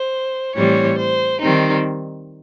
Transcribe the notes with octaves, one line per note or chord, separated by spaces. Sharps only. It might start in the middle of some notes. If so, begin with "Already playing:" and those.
Already playing: C5
A2 E3 G3 C4 C#5
C5
D#3 G3 C4 D#4